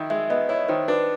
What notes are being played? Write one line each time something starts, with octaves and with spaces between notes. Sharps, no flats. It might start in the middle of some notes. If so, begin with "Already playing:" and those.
Already playing: D#3 E4
G#3 E5
B3 D#5
E4 C#5
D#3 C5
D4 B4